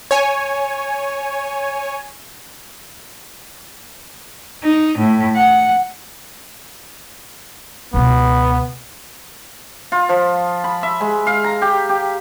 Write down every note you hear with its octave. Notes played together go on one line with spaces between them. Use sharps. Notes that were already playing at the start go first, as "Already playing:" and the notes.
C#5 G#5
D#4
A2
F#5
C#2 B2 B3
F4
F3
B5
E5
G#3
F5
A#5
G4
G4